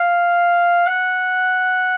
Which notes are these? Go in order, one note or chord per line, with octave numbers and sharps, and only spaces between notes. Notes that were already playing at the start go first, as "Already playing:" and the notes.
Already playing: F5
F#5